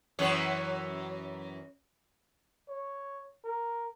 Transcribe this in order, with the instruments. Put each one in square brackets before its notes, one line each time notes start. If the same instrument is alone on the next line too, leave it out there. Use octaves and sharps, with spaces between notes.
[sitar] F#2 E3 C#5
[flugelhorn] C#5
A#4